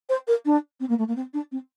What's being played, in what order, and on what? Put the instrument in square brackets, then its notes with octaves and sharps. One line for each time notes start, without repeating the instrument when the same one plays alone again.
[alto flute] C5
A#4
D4
C4
A#3
A3
A#3
C4
D4
C4